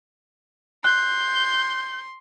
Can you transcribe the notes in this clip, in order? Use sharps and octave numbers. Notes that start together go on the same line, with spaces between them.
C6 F#6 G6